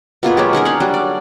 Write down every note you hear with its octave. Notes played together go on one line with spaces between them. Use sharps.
B2 A#3 F4 G#4
F#3 G#3 G4
C#4 D#4 G#4 A#4
D4 C#5 F5 F#5
F#3 G3 D4
D5